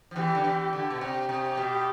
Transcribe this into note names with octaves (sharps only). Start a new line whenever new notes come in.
F3
E2 E3 G4
D3
E2 E3
D3
B2
C3 G4
C3
B2